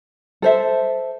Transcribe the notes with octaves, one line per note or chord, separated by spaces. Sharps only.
A4 C5 E5